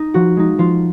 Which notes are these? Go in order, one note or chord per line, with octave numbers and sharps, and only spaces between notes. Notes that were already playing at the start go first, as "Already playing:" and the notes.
Already playing: D#4
F3 F#4
G#3 D#4
F3 F4